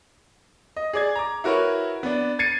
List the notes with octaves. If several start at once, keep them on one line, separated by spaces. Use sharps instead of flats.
D#5
G#4 D5 G#6
A#5 D6
E4 F#4 A#4 B4 C#5
B3 D4
G#6 A6 C7 C#7 D#7